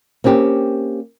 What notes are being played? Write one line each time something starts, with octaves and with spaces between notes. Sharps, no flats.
A#3 C4 C#4 G4